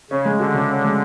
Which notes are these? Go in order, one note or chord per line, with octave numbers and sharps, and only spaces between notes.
C#3 C#4
G#3
D3 F#4
C#3
C#4
G#3